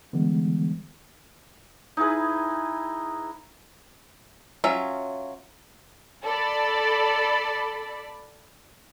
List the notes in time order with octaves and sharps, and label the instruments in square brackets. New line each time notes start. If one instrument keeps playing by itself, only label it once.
[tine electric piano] D3 E3 G3 G#3 B3
[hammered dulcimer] D#4 E4 G#4 B4
[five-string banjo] F#3 C#4 F4 E5
[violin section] A4 D5 B5